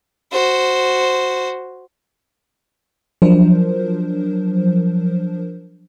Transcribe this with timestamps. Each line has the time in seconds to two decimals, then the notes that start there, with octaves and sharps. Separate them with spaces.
0.32 F#4 C5
3.22 F3 F#3 D4 A#4 C5